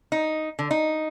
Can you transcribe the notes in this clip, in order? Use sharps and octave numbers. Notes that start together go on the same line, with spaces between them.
D#4
D3
D#4